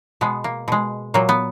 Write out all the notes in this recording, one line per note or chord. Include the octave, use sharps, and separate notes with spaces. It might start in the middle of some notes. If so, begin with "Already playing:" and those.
B2 G#3 B3
A#3
B2 G#3
A#2 F#3 A#3
B3